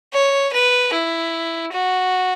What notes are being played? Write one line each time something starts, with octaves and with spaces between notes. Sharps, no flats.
C#5
B4
E4
F#4